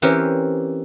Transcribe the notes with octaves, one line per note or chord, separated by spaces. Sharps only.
E3 C4 C#4 G4 A#4